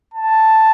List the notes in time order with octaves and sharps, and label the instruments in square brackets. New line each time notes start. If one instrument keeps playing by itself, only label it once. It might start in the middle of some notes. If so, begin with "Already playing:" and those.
[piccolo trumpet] A5